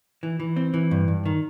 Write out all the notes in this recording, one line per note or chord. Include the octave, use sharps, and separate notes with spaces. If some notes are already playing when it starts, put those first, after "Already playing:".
E3
E3
C4
E3
G2
G2
D#3